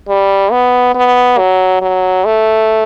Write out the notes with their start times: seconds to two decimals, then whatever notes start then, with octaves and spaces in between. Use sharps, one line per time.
0.09 G3
0.52 B3
0.95 B3
1.38 F#3
1.82 F#3
2.25 A3